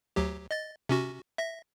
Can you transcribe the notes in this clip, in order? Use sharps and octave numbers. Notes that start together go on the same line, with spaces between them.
D2 F#3 G4
D#5 A6
C3 C#4 F#4
E5 A#6